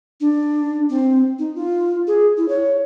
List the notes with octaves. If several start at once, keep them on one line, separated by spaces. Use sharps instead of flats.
D4
C4
D#4
F4
G#4
E4
C#5